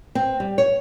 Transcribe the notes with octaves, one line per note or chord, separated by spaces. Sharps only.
C4
G3
C#5